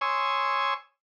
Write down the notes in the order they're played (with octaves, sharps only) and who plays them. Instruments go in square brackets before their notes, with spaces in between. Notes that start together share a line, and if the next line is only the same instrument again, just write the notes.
[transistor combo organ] C#5 G#5 C6 C#6 D#6 E6